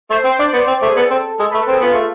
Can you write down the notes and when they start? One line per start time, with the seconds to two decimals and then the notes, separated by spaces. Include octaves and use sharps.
0.10 A3 C5
0.25 C4 C5
0.39 D4 D5
0.53 B3 C5
0.68 C4
0.82 A3
0.87 G#4
0.97 B3 A4
1.11 C4
1.39 G#3 A4
1.51 B4
1.54 A3
1.61 A4
1.68 C4 G#4
1.81 B3 F4
1.94 A3